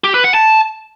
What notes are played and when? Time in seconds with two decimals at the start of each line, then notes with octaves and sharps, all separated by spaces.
0.04 G4
0.14 B4
0.24 F#5
0.34 A5